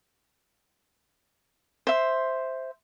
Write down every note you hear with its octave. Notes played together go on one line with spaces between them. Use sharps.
C5 E5